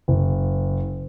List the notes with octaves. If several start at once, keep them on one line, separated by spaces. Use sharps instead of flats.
F#1